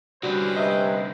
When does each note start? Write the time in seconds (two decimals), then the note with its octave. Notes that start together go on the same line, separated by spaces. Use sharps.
0.23 C2 D3 G3 C#4 F#4 B4 C5
0.57 G2 C3 G3 D#5 E5